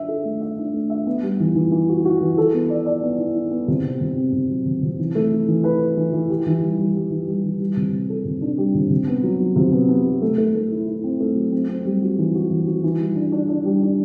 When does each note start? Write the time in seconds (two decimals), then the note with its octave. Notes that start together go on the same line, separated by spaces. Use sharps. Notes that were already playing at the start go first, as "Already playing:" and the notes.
Already playing: D4 E5
0.08 A4
0.25 A3
0.41 E5
0.58 D4
0.74 A3
0.90 E5
1.07 B3
1.23 G3
1.40 E3
1.55 E3
1.71 E3
1.89 F#4
2.05 F#4
2.21 E3
2.38 A4
2.54 B3
2.69 D5
2.86 D5
3.03 B3
3.19 E4
3.35 E4
3.51 B3
3.68 C3
3.84 C4
4.01 C3
4.17 C4
4.33 C3
4.50 F#3
4.66 C3
4.83 C3
4.99 E3
5.15 A3
5.32 E4
5.48 E3
5.64 B4
5.80 B4
5.97 E3
6.13 E3
6.30 G4
6.46 E3
6.63 G3
6.79 G3
6.95 G3
7.11 E3
7.28 G3
7.44 E3
7.60 G3
7.77 C3
7.93 G3
8.10 A4
8.25 C3
8.41 D4
8.58 G3
8.75 C3
8.90 C3
9.07 B3
9.23 F#3
9.40 F#3
9.56 C3
9.73 B3
9.89 B3
10.06 F#3
10.22 A3
10.38 A3
10.55 A3
10.71 E4
10.87 E4
11.04 C4
11.20 A3
11.36 F#3
11.52 C4
11.68 C4
11.85 G3
12.02 F#4
12.18 E3
12.35 F#4
12.50 E3
12.67 F#4
12.83 E3
13.00 G3
13.16 D4
13.32 D4
13.49 D4
13.65 G3
13.82 D4